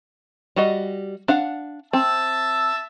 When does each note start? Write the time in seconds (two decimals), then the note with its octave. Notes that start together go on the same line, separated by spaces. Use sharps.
0.56 G3 F#4 D#5
1.28 D4 F5 F#5
1.93 C4 E5 A5